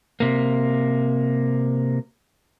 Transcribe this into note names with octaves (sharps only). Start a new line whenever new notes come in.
C3 A#3